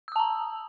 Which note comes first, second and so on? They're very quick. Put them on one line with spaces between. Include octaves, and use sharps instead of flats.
E6 D#6 A5 A#5